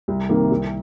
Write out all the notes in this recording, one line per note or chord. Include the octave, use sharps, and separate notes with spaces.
C2
C3 D#3 A#3
C2